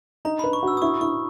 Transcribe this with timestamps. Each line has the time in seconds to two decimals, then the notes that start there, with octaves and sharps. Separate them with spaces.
0.25 D#4 A#5
0.39 B4 B5
0.53 C#6
0.63 F#4 E6
0.77 D#6
0.82 E4 C#6
1.01 E4 C#6